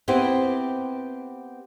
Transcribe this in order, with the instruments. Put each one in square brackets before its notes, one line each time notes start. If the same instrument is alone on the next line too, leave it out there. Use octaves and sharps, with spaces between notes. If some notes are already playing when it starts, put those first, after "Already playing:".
[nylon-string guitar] B3 C4 E4 G4 B4 C5